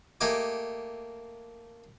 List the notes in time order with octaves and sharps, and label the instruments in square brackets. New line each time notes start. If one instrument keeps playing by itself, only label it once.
[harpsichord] A3 A#3 G4 D#5 G#5 D6